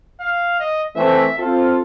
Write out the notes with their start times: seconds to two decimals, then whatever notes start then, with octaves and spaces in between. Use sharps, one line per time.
0.20 F5
0.60 D#5
0.97 E3 A3 C4 E5
1.38 C4 F4 A4